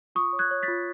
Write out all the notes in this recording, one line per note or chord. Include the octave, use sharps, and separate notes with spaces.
F4 C#6 D#6
C#5
F#6 G#6
C#5
A6 B6
F4